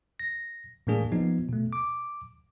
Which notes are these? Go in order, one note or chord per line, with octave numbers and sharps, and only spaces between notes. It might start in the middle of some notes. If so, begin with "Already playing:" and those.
A#6
A2 E3 G#3 A#3 D4 G#4
F3 B3 D#4
B2 A3
D6